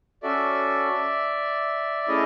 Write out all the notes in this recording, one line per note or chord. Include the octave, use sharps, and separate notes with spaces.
C#4 F#4 A4 D5 E5
E5
A3 C#4 E4 G#4 C#5 D#5